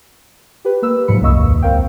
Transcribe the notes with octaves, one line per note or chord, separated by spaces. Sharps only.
G4 B4
A#3 B4 E6
G#2 C3 F3 F#3 B5 C#7
C2 F#2 A#3 D#5 C#6 E6
A#1 D#2
C#2 C4 A#4 F5 G5